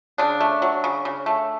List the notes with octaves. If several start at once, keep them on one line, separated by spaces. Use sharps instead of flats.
C#3 D4
A3
F#3
C#3
C#3
A3